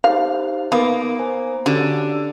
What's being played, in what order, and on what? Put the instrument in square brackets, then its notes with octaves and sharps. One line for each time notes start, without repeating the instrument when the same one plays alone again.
[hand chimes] D#4 G4 C5 [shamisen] F5
[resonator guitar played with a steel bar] A#3 [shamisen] B3 [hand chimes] D#4
[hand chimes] C5 G#5
[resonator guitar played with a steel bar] D3 [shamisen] C#4 [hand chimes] F#4 G4 D5